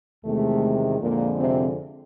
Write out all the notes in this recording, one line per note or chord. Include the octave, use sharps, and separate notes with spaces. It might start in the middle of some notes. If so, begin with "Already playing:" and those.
E2 C3 D#3 G#3 A3
F2 A#2 D3 F3 G#3 A#3
C3 C4